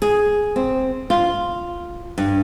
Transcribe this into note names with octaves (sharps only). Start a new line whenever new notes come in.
G#4
C4
F4
G2